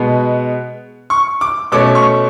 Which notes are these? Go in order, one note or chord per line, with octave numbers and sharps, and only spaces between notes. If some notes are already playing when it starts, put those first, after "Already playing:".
Already playing: B2 G#3 B3
C#6
D6
B2 A3 C#4 D6
C#6